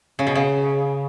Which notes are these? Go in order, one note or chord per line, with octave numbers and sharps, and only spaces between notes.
C#3
B2
C#3